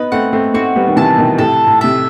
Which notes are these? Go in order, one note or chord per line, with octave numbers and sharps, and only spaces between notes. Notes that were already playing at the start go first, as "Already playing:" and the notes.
Already playing: B3 D#4 B4
A3 C4 F#5
A3 C4
A3 C4 F#4
G3 B3
D#3
C3 E3 A5
B2 D#3
A2 C3 A4
A2
C3 E5